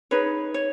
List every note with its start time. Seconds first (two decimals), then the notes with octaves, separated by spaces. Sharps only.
0.11 D#4 G#4 B4 C#5
0.54 C#5